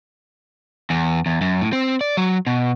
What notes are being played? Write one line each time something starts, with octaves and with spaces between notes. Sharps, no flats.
E2
E2
F#2
A2
C4
D5
F#3
B2